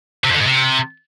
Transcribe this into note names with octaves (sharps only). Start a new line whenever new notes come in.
C3
F2
D3
G#2
C3